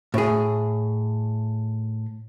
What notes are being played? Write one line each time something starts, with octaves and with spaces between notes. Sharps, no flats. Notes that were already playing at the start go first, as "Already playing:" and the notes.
A2 G#4